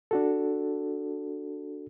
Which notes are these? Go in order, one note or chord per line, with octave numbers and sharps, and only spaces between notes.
D4 F#4 A4